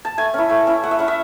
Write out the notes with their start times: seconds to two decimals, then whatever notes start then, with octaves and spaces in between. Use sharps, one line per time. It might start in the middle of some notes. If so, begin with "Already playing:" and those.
0.05 A5
0.18 A3 G#5
0.34 C#4 E4
0.50 A3
0.67 C#4 E4
0.83 A3 F#5
0.91 E5
0.99 C#4 E4 F#5
1.08 E5